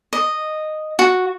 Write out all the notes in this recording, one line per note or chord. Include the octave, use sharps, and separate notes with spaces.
D#5
F#4